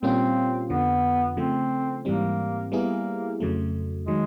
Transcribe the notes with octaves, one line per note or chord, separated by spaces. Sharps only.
A#2 G3 A#3 C4 C#4 F4
F2 D3 F3 B3
C#3 F3 A3 C4
G#2 E3 G3 A#3 C4
G3 A#3 B3 E4 G#4
F2 C#3 F#3 A3
D#3 F#3 G#3